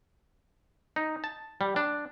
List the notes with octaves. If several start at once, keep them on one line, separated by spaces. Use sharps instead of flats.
D#4
A5
G3
D4